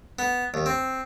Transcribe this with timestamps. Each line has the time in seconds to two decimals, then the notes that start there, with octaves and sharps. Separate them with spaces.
0.19 B3
0.54 D#2
0.66 C4